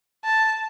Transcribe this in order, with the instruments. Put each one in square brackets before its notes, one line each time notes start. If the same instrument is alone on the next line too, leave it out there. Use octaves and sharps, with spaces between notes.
[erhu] A5